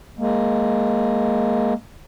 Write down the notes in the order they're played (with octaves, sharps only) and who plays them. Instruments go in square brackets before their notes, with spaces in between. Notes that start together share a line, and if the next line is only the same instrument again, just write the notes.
[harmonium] G#3 A#3